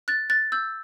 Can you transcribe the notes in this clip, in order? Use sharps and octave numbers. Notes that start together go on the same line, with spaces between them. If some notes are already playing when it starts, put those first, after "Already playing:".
F#6 A6
F#6 A6
E6 G6